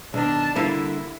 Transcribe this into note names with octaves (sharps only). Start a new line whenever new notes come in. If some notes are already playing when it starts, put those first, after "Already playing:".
B1 D#3 D4 A5
D3 G3 A#3 E4